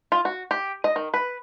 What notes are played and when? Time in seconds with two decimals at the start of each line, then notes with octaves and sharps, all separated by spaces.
0.12 F4
0.25 F#4
0.51 G4
0.84 D#5
0.96 D#3
1.14 B4